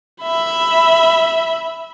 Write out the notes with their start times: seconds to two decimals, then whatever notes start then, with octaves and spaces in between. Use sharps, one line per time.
0.22 E5 B5